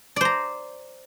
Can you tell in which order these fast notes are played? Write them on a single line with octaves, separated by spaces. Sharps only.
D5 C5 A#5